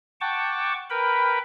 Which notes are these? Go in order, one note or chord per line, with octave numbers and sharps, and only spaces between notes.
F#5 G5 A5 C#6 D6
A#4 B4 G5 B5